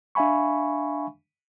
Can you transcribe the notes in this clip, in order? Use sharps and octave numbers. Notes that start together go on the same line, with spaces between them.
D4 E5 F5 G#5 B5 C#6